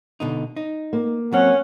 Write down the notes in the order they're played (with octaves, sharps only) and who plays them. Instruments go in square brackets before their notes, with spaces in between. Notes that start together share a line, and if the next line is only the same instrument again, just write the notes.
[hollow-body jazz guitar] B2 D3 D#4
D#4
[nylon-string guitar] A#3
[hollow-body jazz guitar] F#3 C4 [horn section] C#4 F#5